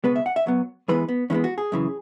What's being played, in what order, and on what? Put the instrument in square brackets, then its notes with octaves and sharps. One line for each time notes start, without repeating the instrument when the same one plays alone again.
[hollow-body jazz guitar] C#2 B2 G#3 B3 B4
E5
F#5
E5
F#2 F#3 B3
E2 E3 G#3 B3 B4
B3
E2 E3 G#3 B3 C#4
F#4
G#4
F#2 C#3 E3